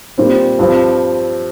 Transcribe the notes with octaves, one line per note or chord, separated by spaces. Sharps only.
A#2 G3 C4
G2 F3 C4